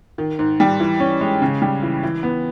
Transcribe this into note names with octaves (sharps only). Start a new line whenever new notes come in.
D#3
G#2
G3
E3
C#4
G#3
C#3
G3
E3
E3
B3